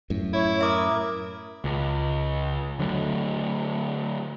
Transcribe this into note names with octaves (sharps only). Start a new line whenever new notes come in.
F#2 A2
E4 C#5
A#4 E5 D6 D#6
C#2
D3 F#3 G#3 A3